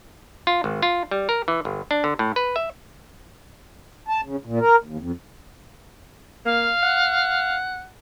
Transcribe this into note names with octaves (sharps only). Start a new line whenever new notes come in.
F4
G#1
F4
G3
A#4
E3
G1
D4
D3
A2
B4
E5
A5
C#3
A#2
A#4
D#2
F2
A#3 F5
F#5